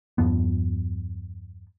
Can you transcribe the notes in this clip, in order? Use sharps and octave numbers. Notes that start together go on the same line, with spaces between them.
E2 G2 F3 B3